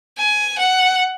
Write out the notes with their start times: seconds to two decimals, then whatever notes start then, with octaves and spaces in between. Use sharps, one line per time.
0.18 G#5
0.58 F#5